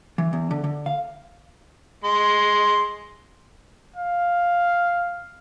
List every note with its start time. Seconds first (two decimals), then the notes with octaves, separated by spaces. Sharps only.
0.18 E3
0.33 E2
0.51 D3
0.64 D3
0.86 F5
2.04 G#3 C6
3.96 F5